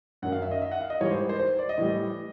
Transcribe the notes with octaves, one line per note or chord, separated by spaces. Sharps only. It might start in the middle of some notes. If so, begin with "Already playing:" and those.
F#2 D#3 F#3 F#5
F5
E5
D#5
E5
F#5
F5
D#5
G#2 E3 G3 C#5
C5
C5
C5
D5
D#5
A2 E3 G3